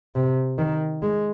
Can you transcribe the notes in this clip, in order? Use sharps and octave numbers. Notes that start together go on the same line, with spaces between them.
C3
D#3
G#3